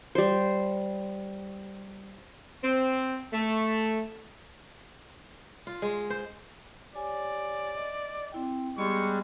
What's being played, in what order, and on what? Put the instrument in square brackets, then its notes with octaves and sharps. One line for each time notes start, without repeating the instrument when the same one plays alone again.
[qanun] G3 C5
[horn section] C4
A3
[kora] F4
G#3
C5
[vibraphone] G4 C#5 G#5 [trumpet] D5
[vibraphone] D#5
C4 E4 G5
[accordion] G3 G#3 [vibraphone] B3 G4 [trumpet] C#6